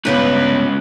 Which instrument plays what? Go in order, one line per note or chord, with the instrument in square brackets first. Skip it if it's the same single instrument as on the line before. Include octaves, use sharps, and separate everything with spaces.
[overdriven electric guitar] C#2 B4 [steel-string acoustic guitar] G2 C#3 B3